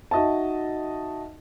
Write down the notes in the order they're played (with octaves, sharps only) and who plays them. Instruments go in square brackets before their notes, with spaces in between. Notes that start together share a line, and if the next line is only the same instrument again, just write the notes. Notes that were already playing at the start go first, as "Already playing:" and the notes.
[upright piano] D#4 F#4 D#5 E5 A5